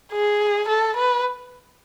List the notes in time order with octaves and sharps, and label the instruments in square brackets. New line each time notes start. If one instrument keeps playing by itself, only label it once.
[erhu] G#4
A4
B4